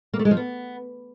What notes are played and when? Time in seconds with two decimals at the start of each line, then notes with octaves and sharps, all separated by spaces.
0.14 A#3
0.19 A3
0.25 G#3
0.31 F3
0.37 B3